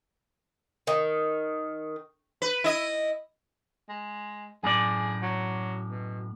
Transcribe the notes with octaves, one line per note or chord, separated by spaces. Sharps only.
D#3
B4
E4 D#5
G#3
F#2 A2 G#4 D5
F#3
B2